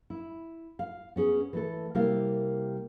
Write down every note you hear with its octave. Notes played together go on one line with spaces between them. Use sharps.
E4
F5
B3 C#4 G#4
E3 A3 A4
C3 G3 A#3 E4 A#4 F5